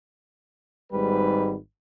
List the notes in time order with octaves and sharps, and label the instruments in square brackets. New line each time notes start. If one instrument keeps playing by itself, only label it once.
[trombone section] G#1 G#2 G3 B4